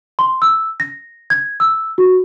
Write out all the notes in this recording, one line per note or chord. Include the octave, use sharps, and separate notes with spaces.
C6
E6
A#6
G#6
E6
F#4